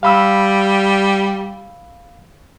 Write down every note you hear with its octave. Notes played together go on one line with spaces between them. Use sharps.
G3 F5 B5 E6